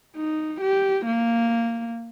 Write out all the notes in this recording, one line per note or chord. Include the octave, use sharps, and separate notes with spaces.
D#4
G4
A#3